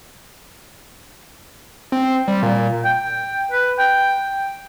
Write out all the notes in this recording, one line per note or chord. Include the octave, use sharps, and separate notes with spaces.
C4
G3
A#2
G5
B4
G5